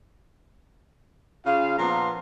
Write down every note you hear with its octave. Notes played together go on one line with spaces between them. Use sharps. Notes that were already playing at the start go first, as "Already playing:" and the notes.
C#3 F4 G#4 F5
A#2 F3 B3 D4 A#5 C6